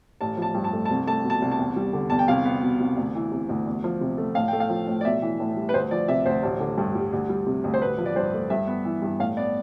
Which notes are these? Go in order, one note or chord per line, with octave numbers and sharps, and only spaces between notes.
A1 A5
F3 A5
G2
A5
A3
C2 A5
A3 A5
B2
A5
C2
A5
E2
G3
D3
E2 A5
G5
C2 F5
B3
B2
C2
D2
E3
C3
D2
E2
F3
C3
A3
A2 F5
A3 G5
F5
F3
A2
D5
B1 E5
E3
A2
G3
B4
D2 C5
F3 D5
C3 E5
D2 C5
A1
D3
G2
G3
D2
G3
C3
D2
C5
A1 B4
F3
D5
G2 C5
A3
G2 E5
B3
E3
G2
A2 F5
B3 D5